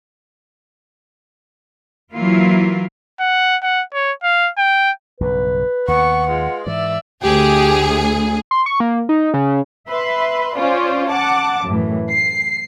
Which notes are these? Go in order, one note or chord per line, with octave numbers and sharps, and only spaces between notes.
E3 F#3 A#3 E4 F4
F#5
F#5
C#5
F5
G5
B1 G2 C#3 B4
D#2 B3 F#5 C#6
G#3 F4
G#2 E3 D5 E5
D2 G4 G#4
C6
C#6
A#3
D#4
C#3
B4 E5 C6
C#4 F4 C5 D5
F#5 A5 D6
F#2 A2 E3
C7